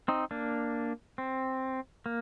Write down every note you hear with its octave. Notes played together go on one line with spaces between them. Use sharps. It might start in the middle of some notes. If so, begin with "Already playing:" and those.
C4 D#4
A#3 D4
C4
A#3